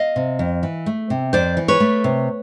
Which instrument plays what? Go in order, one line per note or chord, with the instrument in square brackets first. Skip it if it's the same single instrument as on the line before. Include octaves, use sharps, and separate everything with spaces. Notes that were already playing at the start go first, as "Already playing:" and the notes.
Already playing: [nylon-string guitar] D#5 F5
C3
F2
E3
A3
C3
F2 C5 D5
E3
B4 C#5
A3
C3